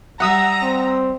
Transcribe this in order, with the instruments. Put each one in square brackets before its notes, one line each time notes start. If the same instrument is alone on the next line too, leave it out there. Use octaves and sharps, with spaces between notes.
[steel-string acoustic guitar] G3 G4 E5 [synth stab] F#5 D#6 E6 [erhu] A#5
[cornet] C4